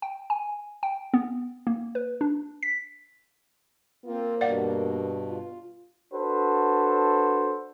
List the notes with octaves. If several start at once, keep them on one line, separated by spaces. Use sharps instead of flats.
G5
G#5
G5
B3
A#3
B4
D4
B6
A#3 C4 F4
G2 B2 D5 F5 F#5
F4
D4 F#4 A4 B4 C5